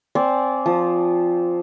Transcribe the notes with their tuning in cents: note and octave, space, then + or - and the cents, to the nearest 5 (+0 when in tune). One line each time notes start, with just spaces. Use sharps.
C4 +0 D5 -20 G#5 +10
F3 +0 D#6 -25